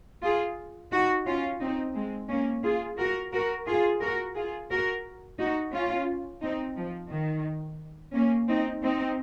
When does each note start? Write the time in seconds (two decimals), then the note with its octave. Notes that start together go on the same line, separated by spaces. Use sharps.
0.23 F4 G#4
0.92 D#4 F#4
1.26 C#4 F4
1.61 C4 D#4
1.95 G#3 C4
2.29 A#3 C#4
2.64 F4 G#4
2.98 F#4 A#4
3.33 F#4 A#4
3.67 F4 G#4
4.01 F#4 A#4
4.36 F4 G#4
4.71 F#4 A#4
5.39 D#4 F#4
5.73 C#4 F4
6.42 C4 D#4
6.77 F3
7.11 D#3
8.14 A#3 C#4
8.48 C4 D#4
8.83 C4 D#4